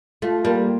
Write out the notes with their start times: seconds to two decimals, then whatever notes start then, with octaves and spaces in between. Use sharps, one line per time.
0.22 A3 F4
0.44 G3 A#3